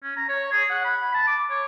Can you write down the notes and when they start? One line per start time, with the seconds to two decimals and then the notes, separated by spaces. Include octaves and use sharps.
0.04 C#4
0.17 A#5
0.29 C#5
0.52 G#4
0.70 F#5
0.85 B5
1.14 A5
1.27 D6
1.50 C#5